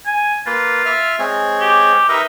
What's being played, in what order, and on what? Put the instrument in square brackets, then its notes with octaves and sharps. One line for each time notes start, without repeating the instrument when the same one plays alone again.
[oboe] G#5
[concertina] A#3 B4 [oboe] F4
[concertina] E5 F6
G#3 C4 C#5
[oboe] G4
[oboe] D#4 [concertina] A#4 B4 E5